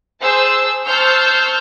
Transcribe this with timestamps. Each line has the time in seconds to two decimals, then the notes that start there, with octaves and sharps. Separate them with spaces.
0.21 G#4 C5 A5 E6
0.87 C5 A5 C#6 E6 F6 G6